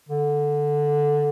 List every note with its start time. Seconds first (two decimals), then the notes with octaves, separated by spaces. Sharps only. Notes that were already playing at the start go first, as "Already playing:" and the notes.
0.09 D3